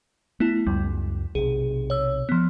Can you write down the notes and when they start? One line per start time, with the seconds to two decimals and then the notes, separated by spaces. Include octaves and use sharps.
0.40 A3 B3 E4
0.67 C#2 F#2 G3
1.35 B1 C3 G#4
1.90 C#5 E6
2.29 F3 B3